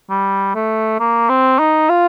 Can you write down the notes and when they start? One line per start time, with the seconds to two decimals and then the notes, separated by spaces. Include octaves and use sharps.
0.10 G3
0.55 A3
1.00 A#3
1.29 C4
1.59 D#4
1.89 F4